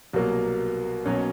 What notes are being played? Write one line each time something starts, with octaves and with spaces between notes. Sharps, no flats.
C2 B2 F#3 A#3
B1 B2 F#3 A#3 C#4